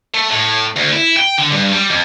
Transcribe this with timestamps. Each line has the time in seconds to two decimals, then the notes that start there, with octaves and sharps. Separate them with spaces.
0.14 A3
0.31 A2
0.76 D2
0.93 E4
1.17 G5
1.38 D3
1.52 G2
1.72 G3
1.90 F2